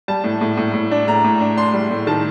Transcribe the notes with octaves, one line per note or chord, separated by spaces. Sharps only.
G3 A5
A2
A2
A2
A2
D4
A2 A#5
A2
D4
D4 C6
G3
A2
D#3 A5